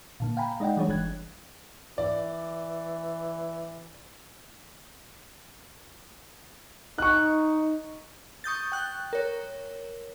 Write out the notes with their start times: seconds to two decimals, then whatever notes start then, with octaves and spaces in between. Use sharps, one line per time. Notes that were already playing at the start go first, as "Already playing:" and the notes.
0.20 A#2 D3 A#3
0.37 F5 G5 G#5 A#5 B5
0.60 G#3 D#4 D5 D#5 F#5 G5
0.77 E3 G3 G#3 D4 G#4 C#5
0.89 G1 E3 D4 F#6 G#6
1.98 E3 D5
6.98 D#4 C#6 F#6
8.44 C#6 D#6 G6 A6
8.72 G5 F#6
9.13 A#4 C#5